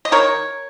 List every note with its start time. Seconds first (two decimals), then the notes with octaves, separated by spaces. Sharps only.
0.05 D#5
0.12 D#3 A#4 C#5